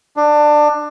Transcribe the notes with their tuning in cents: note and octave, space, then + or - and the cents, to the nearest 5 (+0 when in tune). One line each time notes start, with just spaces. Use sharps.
D4 +20